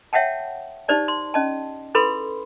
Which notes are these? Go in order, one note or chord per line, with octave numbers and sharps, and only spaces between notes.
C#5 E5 F#5 G5 A5
D#4 G4 C5 D5 A5
C6
C#4 D#5 A5
E4 G#4 A4 B4 B5 C6